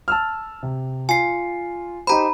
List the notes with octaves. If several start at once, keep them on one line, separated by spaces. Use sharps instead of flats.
A5 E6 F6
C3
F4 G#5 C7
D#4 G4 C5 A#5 B5